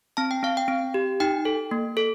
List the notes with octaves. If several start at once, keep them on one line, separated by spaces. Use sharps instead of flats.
C4 A5
G5
C4 F5
G5
C4
G4
D#4 G5
A4
A#3
A4